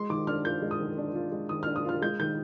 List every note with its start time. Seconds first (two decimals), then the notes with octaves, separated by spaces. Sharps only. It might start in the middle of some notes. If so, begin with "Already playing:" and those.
Already playing: G#3 C6
0.10 D#3 D6
0.27 D4 F6
0.45 F4 G6
0.62 G#3
0.71 D#6
0.80 D#3
0.98 D4
1.15 F4
1.32 G#3
1.49 D#3 D#6
1.63 D4 F6
1.76 D#6
1.85 F4 F6
2.02 G#3 G6
2.20 D#3 G6